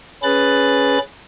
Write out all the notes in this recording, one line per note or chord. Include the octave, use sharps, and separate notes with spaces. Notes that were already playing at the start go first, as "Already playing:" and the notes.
C#4 G#4 B4 F#6 A6